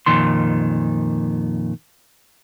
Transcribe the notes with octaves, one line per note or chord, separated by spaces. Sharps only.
F2 A#2 D#3 C6